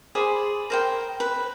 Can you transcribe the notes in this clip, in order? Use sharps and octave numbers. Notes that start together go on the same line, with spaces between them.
G#4 C5 D5 B5
A#4 C5 G5
B4